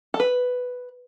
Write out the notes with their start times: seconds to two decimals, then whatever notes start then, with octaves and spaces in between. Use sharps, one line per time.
0.14 A4
0.20 B4